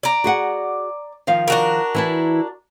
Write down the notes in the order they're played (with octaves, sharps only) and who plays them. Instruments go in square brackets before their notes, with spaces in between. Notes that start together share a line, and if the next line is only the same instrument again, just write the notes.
[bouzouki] D5 A#5
[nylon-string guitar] F#4 G#4 F#5
D#3 F3 F5
[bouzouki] D4 F#4 A#4
[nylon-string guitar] E3 E4 A5